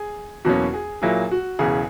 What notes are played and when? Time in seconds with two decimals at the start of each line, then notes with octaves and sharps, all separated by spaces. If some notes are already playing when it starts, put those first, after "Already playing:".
Already playing: G#4
0.45 E2 B2 F#3 A#3 C#4 F#4
0.74 G#4
1.02 A#2 F#3 A#3 E4 G#4
1.31 F#4
1.59 E1 E2 C#3 G#4